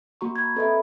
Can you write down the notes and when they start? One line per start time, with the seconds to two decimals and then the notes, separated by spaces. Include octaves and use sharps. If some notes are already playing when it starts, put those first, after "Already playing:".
0.21 A#3 F#4 A#5 C#6
0.36 A#5 B5 G#6
0.56 C4 A4 B4 D#5 E5 B5